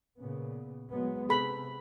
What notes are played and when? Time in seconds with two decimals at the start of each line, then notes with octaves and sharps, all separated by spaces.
0.18 A#2 C#3 B3
0.91 F#3 G#3 B3
1.29 C3 G#4 A4 B5